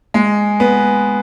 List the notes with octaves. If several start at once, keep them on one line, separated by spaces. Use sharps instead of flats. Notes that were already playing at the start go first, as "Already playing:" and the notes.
G#3
B3